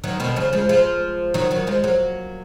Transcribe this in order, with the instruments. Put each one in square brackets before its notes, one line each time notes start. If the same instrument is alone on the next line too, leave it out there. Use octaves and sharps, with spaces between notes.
[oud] D#3 F#3
B2 D#3
C#3 F3
F3 G#3
F3 G#3
D#3 F#3
D#3 F#3
F3 G#3
F#3 A#3